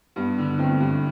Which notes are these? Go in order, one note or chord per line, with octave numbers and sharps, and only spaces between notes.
G2 B3
D3
G1 A3 C4
G2